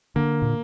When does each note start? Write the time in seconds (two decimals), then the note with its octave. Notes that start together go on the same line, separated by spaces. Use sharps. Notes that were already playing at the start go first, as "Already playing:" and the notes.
0.16 D3 A#3
0.42 A#2